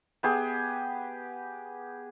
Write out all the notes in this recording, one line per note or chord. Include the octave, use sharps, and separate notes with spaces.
B3 G4 G#4